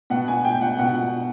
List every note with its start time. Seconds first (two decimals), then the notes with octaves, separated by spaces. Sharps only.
0.10 B2 F#5
0.28 G#5
0.44 G5
0.55 G5
0.61 F#5
0.79 B2 F#5